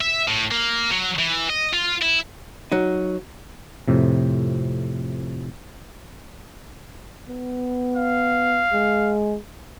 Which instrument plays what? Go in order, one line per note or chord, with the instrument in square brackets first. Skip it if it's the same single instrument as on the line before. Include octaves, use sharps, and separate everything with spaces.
[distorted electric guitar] E5
A2
A#3
F#3
E3
D#5
F4
E4
[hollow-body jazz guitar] F#3 D#4
[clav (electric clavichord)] F2 A2 C3
[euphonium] B3
[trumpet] F5
[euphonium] G#3